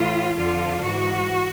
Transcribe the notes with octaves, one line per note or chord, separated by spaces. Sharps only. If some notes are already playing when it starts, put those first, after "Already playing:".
Already playing: A2 E3 F4
F2 D3 F3 F4
G#2 E3 F#4